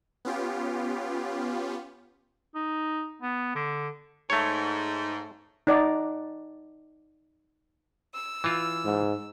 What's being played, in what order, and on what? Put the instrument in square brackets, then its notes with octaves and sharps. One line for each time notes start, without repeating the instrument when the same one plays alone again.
[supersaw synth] B3 C#4 F4 G4
[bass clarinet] D#4
B3
D3
[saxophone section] G#2 [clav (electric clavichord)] A3 C#5
[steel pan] D#4 D5 F#5 A#5
[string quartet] E6
[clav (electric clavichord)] E3 F4
[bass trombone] G#2